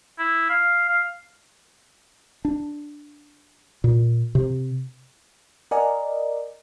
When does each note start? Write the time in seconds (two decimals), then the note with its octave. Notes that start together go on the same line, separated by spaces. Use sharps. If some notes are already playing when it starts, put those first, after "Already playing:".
0.19 E4
0.50 F5
0.88 F5
2.45 D4
3.84 A#2
4.35 C3
5.71 A#4 D5 D#5 F#5 G#5 A#5